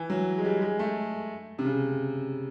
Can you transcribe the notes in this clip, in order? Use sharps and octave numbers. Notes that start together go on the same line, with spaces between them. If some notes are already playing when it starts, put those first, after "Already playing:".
Already playing: E3
F#3
G#3
G3
G#3
A3
C3
C#3